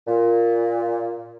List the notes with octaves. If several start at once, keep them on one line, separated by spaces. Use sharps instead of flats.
A#2